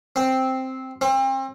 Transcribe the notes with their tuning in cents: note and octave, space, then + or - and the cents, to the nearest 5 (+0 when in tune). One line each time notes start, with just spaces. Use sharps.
C4 +0
C4 +35